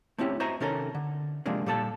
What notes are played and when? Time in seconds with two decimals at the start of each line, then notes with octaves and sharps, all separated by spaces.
0.18 A3 C4 C#4 E4 G4
0.40 F#4 C5 D#5 E5 G#5 A#5
0.60 C3 D#3 C#4 A4 A#4
0.95 D3
1.46 C3 F3 G#3 A#3 D4
1.66 A#2 G3 A4 B4 A5